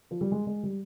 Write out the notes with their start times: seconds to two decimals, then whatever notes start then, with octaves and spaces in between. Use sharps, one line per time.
0.11 F3
0.21 G3
0.32 G#3
0.47 G#3
0.63 G3